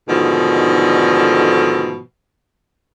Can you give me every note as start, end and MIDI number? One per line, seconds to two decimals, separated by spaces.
0.08 2.00 44
0.08 2.00 47
0.08 2.00 50
0.08 2.00 51
0.08 2.00 53
0.08 2.00 57